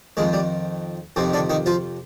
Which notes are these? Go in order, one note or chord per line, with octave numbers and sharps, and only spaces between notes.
F2 D#3 G#3
G3
F2 C3 D#3 C4
D3 D4
D#3 D#4
F3 F4